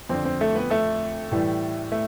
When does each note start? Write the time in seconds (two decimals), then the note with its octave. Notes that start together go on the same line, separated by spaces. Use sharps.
0.09 F2 D3 F3 C4
0.25 C4
0.41 A3 A4
0.55 B3 B4
0.70 A3 A4
1.32 A2 E3 G3
1.92 A3